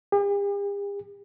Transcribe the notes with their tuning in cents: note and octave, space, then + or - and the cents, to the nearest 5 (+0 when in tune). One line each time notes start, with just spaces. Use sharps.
G4 +45